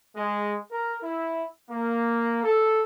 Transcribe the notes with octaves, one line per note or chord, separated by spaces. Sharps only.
G#3
A#4
E4
A#3
A4